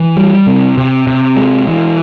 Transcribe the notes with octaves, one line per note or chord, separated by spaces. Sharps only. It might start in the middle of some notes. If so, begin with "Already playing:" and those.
Already playing: E3
G3
C3
C3
C3
G#3
E3